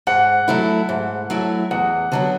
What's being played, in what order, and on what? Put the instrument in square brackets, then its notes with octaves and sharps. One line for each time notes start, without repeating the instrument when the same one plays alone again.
[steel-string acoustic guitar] G#2 [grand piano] F#5
[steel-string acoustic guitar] F#3 A3 E4
G#2
F#3 A3 E4
[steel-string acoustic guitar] E2 [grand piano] F#5
[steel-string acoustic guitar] D3 F#3 B3